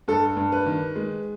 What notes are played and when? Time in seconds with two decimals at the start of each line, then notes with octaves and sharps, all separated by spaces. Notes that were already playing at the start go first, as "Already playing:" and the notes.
0.08 G2 A4
0.37 G2
0.52 B4
0.66 D#3
0.96 G#3